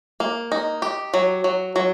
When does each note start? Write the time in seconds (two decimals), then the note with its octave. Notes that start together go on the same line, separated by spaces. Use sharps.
0.20 A#3
0.52 D#4
0.82 G4
1.14 F#3
1.44 F#3
1.76 F#3